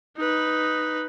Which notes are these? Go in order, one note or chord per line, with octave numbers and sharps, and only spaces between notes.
D#4 B4